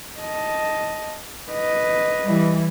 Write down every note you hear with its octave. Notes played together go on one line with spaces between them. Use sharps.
D#5 A5
B4 D#5
E3 G3